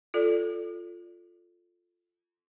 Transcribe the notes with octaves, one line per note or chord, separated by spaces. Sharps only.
F4 A4 D5